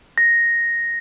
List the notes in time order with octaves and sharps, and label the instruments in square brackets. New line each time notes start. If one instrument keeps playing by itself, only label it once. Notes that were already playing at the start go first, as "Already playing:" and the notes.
[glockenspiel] A#6